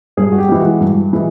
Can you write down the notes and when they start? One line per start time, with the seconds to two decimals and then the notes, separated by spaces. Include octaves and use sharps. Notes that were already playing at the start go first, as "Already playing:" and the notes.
0.17 G2 G#4
0.32 F#4
0.38 G4
0.49 E3 G#3
0.60 F#4
0.80 G2
1.13 E3 G#3